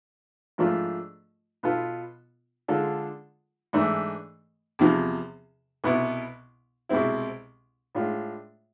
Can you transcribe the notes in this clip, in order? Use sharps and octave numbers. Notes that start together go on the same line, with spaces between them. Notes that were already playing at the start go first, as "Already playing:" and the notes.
G#2 F3 A3 D4 F4
B2 B3 F4 A4
D3 G#3 D4 F4 A4
G#2 E3 A3 D4
E2 C3 F3
C2 B2 B3 E4
C2 B2 G#3 C4 E4
A2 G#3 D4 F4